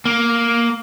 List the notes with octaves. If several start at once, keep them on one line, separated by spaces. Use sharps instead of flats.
A#3